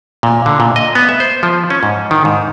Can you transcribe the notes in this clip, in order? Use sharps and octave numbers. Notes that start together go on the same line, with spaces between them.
A#2
D3
A#2
D#5
B3
E5
C5
F3
C#4
G#2
D#3
G#2